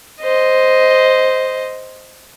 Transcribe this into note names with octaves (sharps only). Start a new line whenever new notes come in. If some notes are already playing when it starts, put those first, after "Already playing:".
C5 D#5